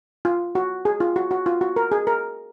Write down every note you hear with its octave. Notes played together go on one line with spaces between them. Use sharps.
F4
F#4
G#4
F4
F#4
F#4
F4
F#4
A#4
G#4
A#4